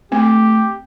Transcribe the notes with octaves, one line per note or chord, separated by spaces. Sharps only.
A3 C4 G4